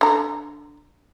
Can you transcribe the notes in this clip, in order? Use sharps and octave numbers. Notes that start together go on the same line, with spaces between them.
D3 A#5